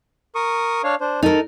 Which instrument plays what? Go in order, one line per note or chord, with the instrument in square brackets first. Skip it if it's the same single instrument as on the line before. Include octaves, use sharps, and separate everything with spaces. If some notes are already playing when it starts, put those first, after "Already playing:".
[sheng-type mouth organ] A#4 C#6 D#6
D4 C#5 F5
D4 C5
[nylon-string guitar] D#4 A#4 [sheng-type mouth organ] A4